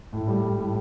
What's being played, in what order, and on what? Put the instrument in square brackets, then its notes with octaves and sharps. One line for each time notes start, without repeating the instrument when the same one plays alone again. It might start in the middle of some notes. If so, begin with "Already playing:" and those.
[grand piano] A2
G3
G3
A2